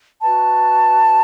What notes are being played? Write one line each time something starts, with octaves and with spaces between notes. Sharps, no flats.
F#4 B4 A5